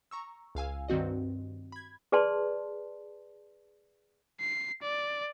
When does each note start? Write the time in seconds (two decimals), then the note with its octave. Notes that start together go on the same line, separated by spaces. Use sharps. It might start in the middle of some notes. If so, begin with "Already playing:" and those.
0.11 A#5 C#6 E6
0.55 C#2 F5 G#5 E6
0.89 G2 D#3 C4 F#4 D#5
1.72 B5 G#6
2.12 G#4 B4 D5 A5 C6
4.41 C7
4.82 D5